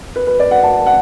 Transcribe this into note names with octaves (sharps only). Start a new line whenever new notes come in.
B4
B4
D5
F#5
A5
F#5